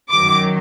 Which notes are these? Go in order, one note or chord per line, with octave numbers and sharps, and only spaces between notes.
F#2 D#3 F#3 D6